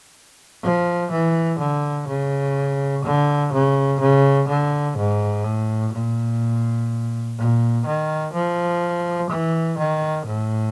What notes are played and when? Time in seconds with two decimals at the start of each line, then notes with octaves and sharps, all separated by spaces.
0.63 F3
1.11 E3
1.59 D3
2.08 C#3
3.04 D3
3.53 C#3
4.00 C#3
4.48 D3
4.97 G#2
5.44 A2
5.93 A#2
7.38 A#2
7.86 D#3
8.33 F3
9.30 E3
9.78 D#3
10.26 A2